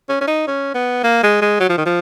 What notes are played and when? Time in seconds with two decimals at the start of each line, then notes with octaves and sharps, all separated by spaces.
0.09 C#4
0.21 C#4
0.27 D#4
0.47 C#4
0.74 B3
1.04 A#3
1.23 G#3
1.41 G#3
1.60 F#3
1.69 F3
1.77 D#3
1.86 F3